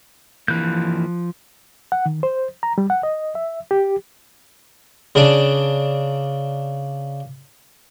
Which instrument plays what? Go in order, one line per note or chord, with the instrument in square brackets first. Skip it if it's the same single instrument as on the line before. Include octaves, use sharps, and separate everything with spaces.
[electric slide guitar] E3 A#3 [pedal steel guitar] F3 F#6 G6
[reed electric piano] F#5
D#3
C5
A#5
G3
F#5
D#5
E5
G4
[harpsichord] C#3 D4